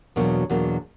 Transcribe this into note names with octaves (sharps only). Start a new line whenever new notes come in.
E2 B2 F#3 A#3 D4
E2 B2 F#3 A#3 D4